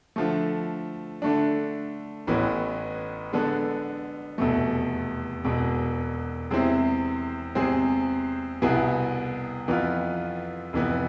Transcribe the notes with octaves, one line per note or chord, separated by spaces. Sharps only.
D3 F3 A3
D3 A3 D4
A1 A2 E3 B3
D3 G#3 B3 D4 A4
F1 E2 B2 A3
E1 E2 B2 G#3
E2 C3 G#3 C4 E4
E2 C3 G#3 C4 G#4
C2 B2 B3 E4 G#4
F2 E3 B3 F4
F1 F2 E3 B3